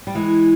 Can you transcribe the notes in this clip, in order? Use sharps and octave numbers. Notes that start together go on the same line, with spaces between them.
G3
E3 G#3